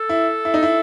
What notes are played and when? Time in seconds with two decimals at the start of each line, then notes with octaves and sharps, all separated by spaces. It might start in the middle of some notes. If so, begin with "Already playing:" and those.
Already playing: A4
0.09 E4
0.45 E4
0.54 D#4
0.63 E4